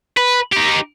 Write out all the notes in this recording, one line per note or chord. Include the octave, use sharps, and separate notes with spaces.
B4
D#4 G4